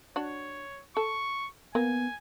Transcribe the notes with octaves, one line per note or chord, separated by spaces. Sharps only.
D4 F#4 C#5
A4 C#6
A#3 B3 G#5